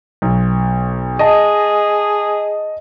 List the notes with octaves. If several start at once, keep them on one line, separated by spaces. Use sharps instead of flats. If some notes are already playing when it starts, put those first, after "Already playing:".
B1
G#4 D#5 A5